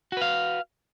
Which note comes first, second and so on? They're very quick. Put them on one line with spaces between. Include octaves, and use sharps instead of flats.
F#4 B4 F5